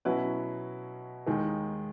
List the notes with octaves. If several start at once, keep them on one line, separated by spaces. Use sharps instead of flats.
B2 F#3 C#4 E4 B4
D#2 D#3 G#3 D#4 G#4